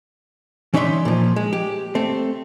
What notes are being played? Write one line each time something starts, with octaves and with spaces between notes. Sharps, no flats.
E3 C#4 D#4 D5 E5 C6
A#2 F3
G#3
G4
A3 C4